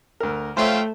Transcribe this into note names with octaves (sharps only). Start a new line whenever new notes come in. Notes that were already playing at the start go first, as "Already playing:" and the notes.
D2 A#4
A3 F4 C5 C#5 E5 F5 G5